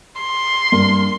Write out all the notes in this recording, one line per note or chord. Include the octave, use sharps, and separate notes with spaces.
C6
G2 A#3